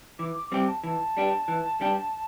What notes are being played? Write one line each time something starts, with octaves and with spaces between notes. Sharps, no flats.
E3 D6
D6
G3 C4 G4 D6
A5
E3 A5
G3 D4 G4
E3
G3 D4 G4